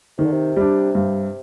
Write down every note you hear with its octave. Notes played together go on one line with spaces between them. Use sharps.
C3 D#3
D3
C3
G3 D4
G2